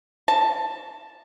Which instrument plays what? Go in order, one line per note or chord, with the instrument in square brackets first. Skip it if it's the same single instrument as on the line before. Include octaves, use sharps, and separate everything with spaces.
[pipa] A5